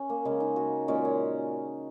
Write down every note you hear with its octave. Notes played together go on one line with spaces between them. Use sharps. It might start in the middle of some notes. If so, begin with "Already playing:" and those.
Already playing: C#4
A#3
C#3 G#3 C#4
D#4
F#4
A#2 G#3 C#4
C#4